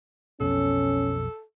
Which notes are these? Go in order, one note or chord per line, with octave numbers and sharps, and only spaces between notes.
B1 F2 B2 C#4 A4